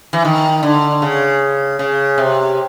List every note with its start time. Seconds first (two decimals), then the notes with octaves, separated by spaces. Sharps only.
0.13 E3
0.25 D#3
0.63 D3
1.02 C#3
1.79 C#3
2.18 C3